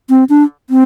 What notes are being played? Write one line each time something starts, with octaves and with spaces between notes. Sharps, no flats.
C4
D4
C4